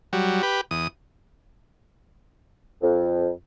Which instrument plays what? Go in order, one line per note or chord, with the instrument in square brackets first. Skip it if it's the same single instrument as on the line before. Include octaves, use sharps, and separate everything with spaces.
[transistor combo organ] F#3 G3
G4 B4
E2 D#6
[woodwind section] F2